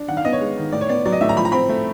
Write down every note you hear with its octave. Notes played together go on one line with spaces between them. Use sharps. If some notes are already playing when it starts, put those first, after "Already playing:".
Already playing: D4
D#3 F#5
F5
B3 D#5
C#5
G#3
D#3
A2 D5
C#5
B3 D5
F#3 D5
D#5
A2 E5
A#5
F3 B5
A#5
C4 B5
A3